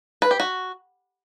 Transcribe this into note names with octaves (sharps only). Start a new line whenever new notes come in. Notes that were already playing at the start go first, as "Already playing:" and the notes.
B4
G4
F#4